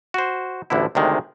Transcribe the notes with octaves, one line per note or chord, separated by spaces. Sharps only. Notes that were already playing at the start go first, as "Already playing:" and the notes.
F#4 C5
A1 D2 D3 E4
D2 C3 D#3 G#3